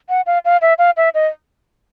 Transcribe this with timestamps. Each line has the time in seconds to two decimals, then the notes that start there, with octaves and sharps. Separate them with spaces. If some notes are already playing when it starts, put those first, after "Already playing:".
0.09 F#5
0.26 F5
0.45 F5
0.62 E5
0.79 F5
0.97 E5
1.14 D#5